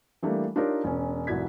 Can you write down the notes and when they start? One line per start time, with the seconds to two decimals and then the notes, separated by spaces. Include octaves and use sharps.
0.22 E3 G3 A3 A#3 D4
0.56 D4 D#4 F4 G4 A#4 C#5
0.84 E1 C#4
1.27 F1 C2 E4 F#4 G#6 B6